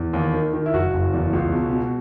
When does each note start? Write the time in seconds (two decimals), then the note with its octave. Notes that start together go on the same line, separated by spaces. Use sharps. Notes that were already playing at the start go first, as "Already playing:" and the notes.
Already playing: E2
0.13 D#2
0.34 D#3
0.54 D#3
0.66 E4
0.73 F#1 F#4
0.94 F#1
1.13 E2
1.33 C#2
1.53 B2
1.73 B2